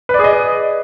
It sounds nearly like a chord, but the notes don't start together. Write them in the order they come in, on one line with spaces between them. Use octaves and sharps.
B4 D5 G#4 D#5